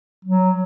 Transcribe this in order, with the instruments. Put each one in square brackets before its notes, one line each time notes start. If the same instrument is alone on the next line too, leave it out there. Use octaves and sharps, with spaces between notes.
[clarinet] F#3